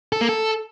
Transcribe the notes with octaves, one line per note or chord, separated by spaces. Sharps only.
A4
A#3
A4